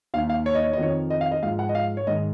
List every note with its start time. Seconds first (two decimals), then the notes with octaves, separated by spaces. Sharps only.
0.14 D#2 D#3 F5
0.30 F5
0.46 C#5
0.55 D#5
0.64 C#5
0.73 D#5
0.78 F2 D#3 C#5
1.10 D#5
1.21 F5
1.32 D#5
1.42 G#2 F3 F5
1.59 F#5
1.69 D#5
1.75 F5
1.97 C#5
2.07 G#2 D#3 D#5